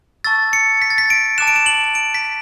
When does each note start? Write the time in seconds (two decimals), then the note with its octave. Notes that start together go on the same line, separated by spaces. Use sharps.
0.24 A5 C#6 E6 A6
0.53 C#7
0.82 B6
0.90 A6
0.98 B6
1.10 D7
1.38 A5 D6 F#6 E7
1.47 D7
1.56 E7
1.66 F#7
1.95 D7
2.14 B6